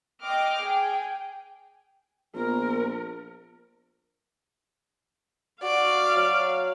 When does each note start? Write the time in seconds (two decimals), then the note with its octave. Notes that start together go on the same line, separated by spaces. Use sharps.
0.23 D#5 G5 C6 D6 F6
0.62 G#4 G5 G#5
2.35 A#1 B3 A#4
5.63 F#4 D5 F5
6.16 F#3